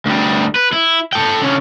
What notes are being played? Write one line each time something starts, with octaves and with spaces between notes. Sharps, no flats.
D2 G3
B4
E4
A4 G5
D3 C#4